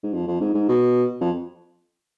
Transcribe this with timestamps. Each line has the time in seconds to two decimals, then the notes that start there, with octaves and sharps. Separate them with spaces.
0.03 G#2
0.14 F2
0.27 F2
0.41 G#2
0.54 G#2
0.68 B2
1.21 F2